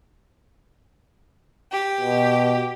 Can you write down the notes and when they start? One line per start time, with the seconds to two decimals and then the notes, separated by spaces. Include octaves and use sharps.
1.72 G4
2.01 B2